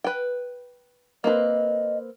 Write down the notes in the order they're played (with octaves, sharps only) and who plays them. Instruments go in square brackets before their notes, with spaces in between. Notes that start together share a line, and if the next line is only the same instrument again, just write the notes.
[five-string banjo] B4 G5
[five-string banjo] A#3 C4 B4 [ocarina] D#5